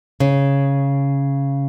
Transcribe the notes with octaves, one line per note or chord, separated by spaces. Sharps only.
C#3